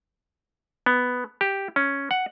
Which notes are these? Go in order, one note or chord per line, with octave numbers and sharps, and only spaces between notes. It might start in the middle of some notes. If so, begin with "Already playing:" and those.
B3
G4
C#4
F#5